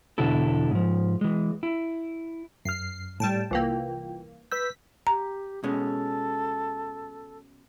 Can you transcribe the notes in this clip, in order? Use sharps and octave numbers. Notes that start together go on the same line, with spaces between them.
E2 B2 D3 E4 A4
G#2 F3
E3 G#3
E4
F#2 F6 C7
A2 G3 G5 A5
C2 E3 A#3 F4 G5
B4 E6 G6 B6
G4 A#5
B2 G#3 C#4 A4